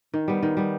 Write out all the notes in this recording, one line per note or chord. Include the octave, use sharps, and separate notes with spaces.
D#3
G3 B3
D#3
G3 B3